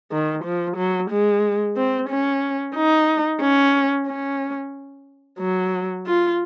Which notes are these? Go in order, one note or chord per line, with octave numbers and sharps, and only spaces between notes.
D#3
F3
F#3
G#3
C4
C#4
D#4
C#4
C#4
F#3
F4